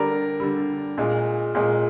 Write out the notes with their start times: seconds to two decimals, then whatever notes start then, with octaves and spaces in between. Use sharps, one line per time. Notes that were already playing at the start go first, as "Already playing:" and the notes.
Already playing: D3 G3 A#4 D5
0.40 D3 G3
0.98 A#2 G#3
1.55 A#2 G#3